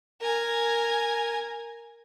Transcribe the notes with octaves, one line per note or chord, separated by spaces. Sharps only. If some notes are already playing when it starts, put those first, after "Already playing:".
A#4 G#5